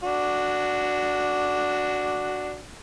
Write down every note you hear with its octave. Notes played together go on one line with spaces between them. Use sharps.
D4 F#4